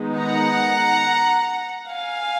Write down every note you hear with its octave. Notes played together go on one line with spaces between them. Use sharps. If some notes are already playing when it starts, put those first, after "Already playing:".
Already playing: D#3 G#3 B3 D#4
F#5 A#5
F5 G#5